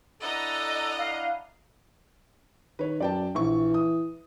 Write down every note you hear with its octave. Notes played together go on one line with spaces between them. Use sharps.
D4 E4 A4 D#5 F#5 A#5
F5
D#3 B4 C#5
F#2 D5 G5 A5
A#1 E3 C#6
D#6